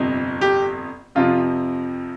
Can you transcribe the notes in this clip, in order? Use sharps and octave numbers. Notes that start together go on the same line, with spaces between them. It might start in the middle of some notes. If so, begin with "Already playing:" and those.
Already playing: G1 F2 C3
G4
F2 C3 F3 F4